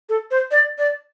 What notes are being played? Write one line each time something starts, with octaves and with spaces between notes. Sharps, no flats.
A4
C5
D5
D5